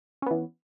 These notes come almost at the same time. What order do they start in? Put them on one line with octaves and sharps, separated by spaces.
C#4 B3 E3